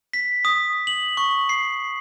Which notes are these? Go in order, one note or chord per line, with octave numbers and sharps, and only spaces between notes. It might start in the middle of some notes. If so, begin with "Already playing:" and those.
B6
D#6
F#7
C#6
C7